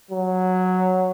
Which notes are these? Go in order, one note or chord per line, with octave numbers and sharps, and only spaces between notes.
F#3